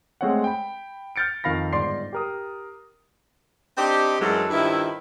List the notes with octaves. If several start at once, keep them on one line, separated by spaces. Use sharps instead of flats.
G#3 A3 C4 C#5 F5 F#5
G5 B5
F6 G6 A6 C#7 D7
F2 D#3 F5 B5 A#6
G1 G#2 D5 C6 C7
G4 A#4 D#6
C4 D4 D#4 G4
F#2 E3 F#3 G#3 D4 A4
G2 D#3 F3 E4